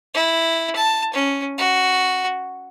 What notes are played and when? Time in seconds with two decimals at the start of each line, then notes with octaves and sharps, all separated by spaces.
0.14 E4
0.76 A5
1.14 C#4
1.58 F#4